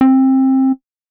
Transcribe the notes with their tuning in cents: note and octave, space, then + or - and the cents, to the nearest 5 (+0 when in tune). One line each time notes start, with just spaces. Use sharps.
C4 +20